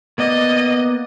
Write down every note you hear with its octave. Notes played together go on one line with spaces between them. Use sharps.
A#3 B3 D5 D#5